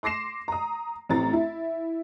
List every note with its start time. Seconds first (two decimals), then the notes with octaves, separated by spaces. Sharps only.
0.03 C6 D6 A#6 C7 E7
0.48 A#5 D#6
1.09 A1 A2 C4 A#5 A6
1.33 E4